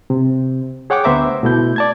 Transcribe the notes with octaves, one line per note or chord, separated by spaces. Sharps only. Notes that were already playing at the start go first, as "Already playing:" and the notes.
C3
G#4 C#5 F#5 G5 C#6 D6
D2 B3 C5 E5 A#5 D6
B2 A3 E4 G6
D5 A5 G#6